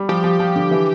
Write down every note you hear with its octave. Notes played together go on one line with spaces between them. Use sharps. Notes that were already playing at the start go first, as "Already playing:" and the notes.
Already playing: G3
F3 G4
F3
F3
D3
E3